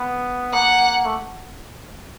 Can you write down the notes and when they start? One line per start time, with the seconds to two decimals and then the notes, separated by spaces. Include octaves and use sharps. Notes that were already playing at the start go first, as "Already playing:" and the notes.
Already playing: B3
0.53 A#3 F#5
1.05 A3